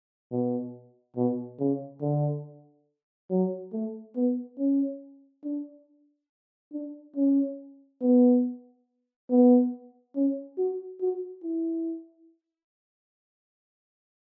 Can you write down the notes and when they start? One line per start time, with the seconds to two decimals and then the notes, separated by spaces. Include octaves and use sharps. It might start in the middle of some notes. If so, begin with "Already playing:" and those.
0.31 B2
1.16 B2
1.59 C#3
2.02 D3
3.30 F#3
3.73 A3
4.15 B3
4.58 C#4
5.44 D4
6.73 D4
7.16 C#4
8.01 B3
9.30 B3
10.16 C#4
10.58 F#4
11.01 F#4
11.43 E4